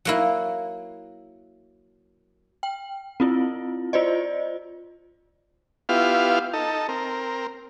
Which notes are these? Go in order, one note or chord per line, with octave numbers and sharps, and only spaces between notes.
F#3 A#3 E4
G5
C4 E4 F4
F4 C5 D5 D#5
B3 E4 F4 G4 F5
D#4 A4
C4 A#4